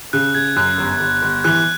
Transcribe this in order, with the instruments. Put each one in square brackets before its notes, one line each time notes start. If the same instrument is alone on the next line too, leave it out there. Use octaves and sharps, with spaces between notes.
[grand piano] C#3 [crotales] F#6
[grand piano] C#3 [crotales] G#6
[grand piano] F#2 [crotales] F#6
[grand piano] G1
G1
G1
[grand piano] E3 [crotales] F#6